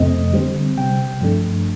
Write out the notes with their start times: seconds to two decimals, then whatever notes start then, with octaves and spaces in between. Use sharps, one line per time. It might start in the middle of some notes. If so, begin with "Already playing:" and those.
Already playing: F2 C3 F3 A3 C4 D#5
0.33 D3 G3 C4
0.77 C3 G3 C4 G5
1.21 G2 F3 A3 D4